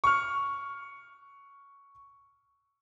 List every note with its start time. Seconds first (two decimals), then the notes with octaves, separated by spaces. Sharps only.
0.04 C#6 F6